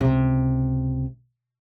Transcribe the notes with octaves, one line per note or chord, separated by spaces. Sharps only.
C#2 C3